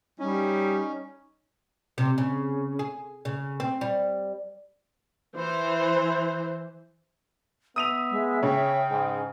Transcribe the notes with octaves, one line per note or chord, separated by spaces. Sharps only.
G3 C#4 D#4
C3
C#3
G#4
C#3
C4
G3
E3 C5
B3 E5 D#6 D#7 F7
G#3
C#3 C#5 G5
G#2 G#5